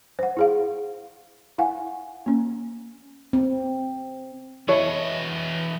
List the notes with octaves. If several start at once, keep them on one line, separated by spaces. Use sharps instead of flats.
C5 F#5
E4 G#4 F5
E4 F5 F#5 G#5
A#3 C#4
C4
E3 E4 A4 C#5 D#5